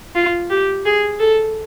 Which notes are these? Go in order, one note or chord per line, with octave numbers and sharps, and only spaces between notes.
F4
G4
G#4
A4